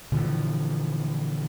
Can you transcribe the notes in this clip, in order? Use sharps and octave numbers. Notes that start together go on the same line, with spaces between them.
A#2 D3 E3 F3